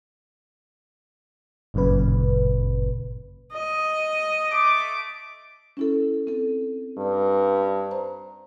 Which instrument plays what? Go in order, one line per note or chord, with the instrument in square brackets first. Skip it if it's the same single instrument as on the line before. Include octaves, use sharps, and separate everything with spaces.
[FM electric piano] G1 F#2 A#2 C#3 B4
[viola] D#5
[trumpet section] A3 D6
[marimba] C#4 E4 A4
C4 A4
[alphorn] G2
[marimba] C5 A#5